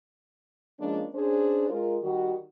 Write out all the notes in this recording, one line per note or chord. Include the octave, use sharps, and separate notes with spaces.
F3 G#3 A#3 C#4 D4
C#4 D4 G#4 C5
G#3 F4 A#4
D#3 G3 F#4